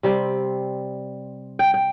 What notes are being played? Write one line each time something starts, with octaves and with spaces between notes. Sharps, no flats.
C3 G3 C4
G5
G5